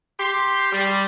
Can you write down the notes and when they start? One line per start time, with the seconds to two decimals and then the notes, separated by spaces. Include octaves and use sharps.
0.20 G4 C6
0.73 G3